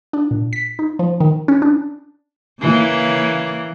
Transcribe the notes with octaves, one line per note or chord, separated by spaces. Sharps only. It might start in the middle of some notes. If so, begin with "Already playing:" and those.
D4
A#2
B6
D#4
F3
D#3
C#4
D4
C#3 E3 A#3